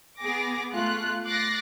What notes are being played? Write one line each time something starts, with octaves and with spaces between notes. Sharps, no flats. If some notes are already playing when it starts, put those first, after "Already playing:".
B3 G#4 D6 A#6
A3 F4 F#6
D6 F#6 A6 A#6 C7